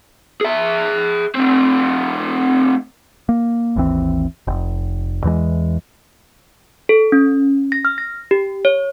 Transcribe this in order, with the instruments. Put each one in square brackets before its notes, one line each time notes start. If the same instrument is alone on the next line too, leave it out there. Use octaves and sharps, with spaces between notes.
[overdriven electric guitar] G#4 E5
A3 C4
[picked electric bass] A#3
G#1 D#2 E3 C4
F1
E2 E3 F#3 G#3
[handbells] A4
C#4
A#6
F6
A#6
G4
C#5